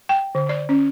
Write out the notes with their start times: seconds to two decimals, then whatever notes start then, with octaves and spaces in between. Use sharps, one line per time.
0.09 G5
0.35 D3
0.49 D5
0.69 C#4